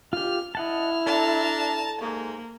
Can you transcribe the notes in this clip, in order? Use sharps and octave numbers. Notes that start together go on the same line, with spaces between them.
F4 G4 F6
E4 D#5 F#5 A5 F6
D4 A4 A5 A#5
G#2 A#3